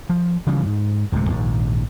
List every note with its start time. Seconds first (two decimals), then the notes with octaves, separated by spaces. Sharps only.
0.09 F3
0.47 C#3 E3 F3 G3
0.66 G#2
1.12 D1 C#2 G#2 C3
1.29 A#1 D#2 G#2